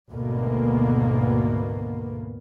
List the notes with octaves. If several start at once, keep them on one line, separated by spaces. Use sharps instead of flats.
G#1 D2 B2 A#3 B3